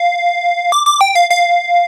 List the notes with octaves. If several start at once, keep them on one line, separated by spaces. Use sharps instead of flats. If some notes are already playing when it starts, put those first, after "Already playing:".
Already playing: F5
D6
D6
G5
F5
F5